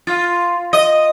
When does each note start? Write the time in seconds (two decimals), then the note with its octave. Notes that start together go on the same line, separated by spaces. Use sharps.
0.07 F4
0.73 D#5